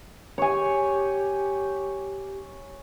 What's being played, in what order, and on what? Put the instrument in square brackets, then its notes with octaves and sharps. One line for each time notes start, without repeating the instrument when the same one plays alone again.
[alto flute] G4 [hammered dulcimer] C#5 G#5